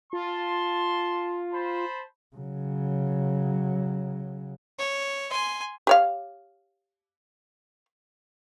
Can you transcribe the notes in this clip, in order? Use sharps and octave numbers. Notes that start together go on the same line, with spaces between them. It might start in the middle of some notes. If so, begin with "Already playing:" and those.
F4 A5 C6
C5 A5 B5
C#3 F#3
C#5
G#5 C6
G4 C#5 F5